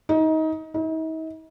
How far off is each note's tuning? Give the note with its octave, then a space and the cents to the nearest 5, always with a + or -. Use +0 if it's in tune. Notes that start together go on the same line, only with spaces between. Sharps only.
D#4 +25
D#4 +45